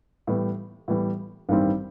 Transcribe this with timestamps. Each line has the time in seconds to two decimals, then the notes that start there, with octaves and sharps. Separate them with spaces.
0.27 A2 E3 G3 B3
0.88 A2 E3 G3 B3
1.49 A1 G2 D#3 G3 C4